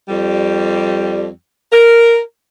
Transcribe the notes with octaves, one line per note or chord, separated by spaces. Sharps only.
F2 G3
A#4